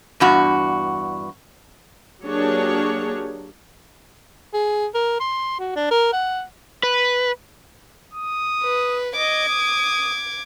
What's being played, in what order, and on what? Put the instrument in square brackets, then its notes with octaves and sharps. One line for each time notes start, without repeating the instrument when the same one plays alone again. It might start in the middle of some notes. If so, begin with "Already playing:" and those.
[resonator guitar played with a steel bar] E2 G2 F#4
[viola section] F#3 A#3 D4 G4 G#4 C#5
[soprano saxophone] G#4
A#4
C6
F#4
D4
A#4
F#5
[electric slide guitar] B4
[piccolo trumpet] D#6
[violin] B4
[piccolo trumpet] D#5 [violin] D6 G#6
[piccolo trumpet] D#6